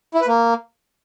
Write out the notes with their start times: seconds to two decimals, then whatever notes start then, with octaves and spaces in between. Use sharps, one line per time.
0.14 E4
0.21 B4
0.27 A#3